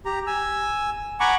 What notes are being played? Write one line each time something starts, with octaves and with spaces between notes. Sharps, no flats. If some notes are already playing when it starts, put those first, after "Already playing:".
G4 A#5
G#5 E6
F#5 G#5 A#5 B5 C#6 D6